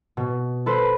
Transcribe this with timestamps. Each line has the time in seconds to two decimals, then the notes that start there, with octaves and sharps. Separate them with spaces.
0.17 B2
0.66 A4 B4 C5